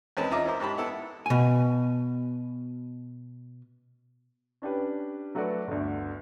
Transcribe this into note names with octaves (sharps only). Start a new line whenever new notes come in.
E2 G#3 C4 C#4 B4 A5
D#4 F4 D#5 E5 A#5 D6
C#4 E4 A#4 C5
G#2 G4 A5 B5
B3 E4 A4
B2 G#5
C#4 D4 G4 B4
F#3 A3 F#4 B4 D5
G1 D2